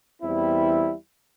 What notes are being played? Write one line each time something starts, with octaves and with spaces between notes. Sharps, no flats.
E2 E3 G3 C4 E4